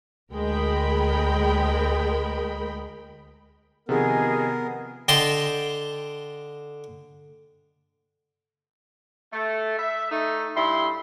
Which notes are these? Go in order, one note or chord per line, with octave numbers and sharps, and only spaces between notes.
D2 G#3 A#4 G5 B5
C3 D#3 F3 B3 G#4 A#4 D#5
D3 D#5 G5 A5 C6
A3
E5
A3 D#4
G2 E4 C6